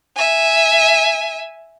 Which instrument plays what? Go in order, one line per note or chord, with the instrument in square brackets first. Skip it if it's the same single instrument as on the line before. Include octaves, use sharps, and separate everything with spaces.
[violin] E5 G#5